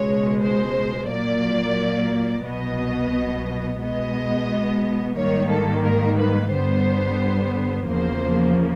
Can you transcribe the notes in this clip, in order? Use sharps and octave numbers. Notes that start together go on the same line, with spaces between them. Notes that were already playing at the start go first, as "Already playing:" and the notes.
Already playing: C#2 B2 G#3 C#5
C5
A#2 F#3 A#3 D5
C2 B2 F#3 B3 D#5
B2 G#3 B3 D#5
G#2 D#3 G3 A#3 C#5
A4
A#4
B4
G2 D3 G3 B3 C5
E2 C#3 F3 A#3 C5